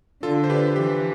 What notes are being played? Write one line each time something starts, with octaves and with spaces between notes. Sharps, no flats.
D3 F4 A4
C5
G4 B4
E3 G4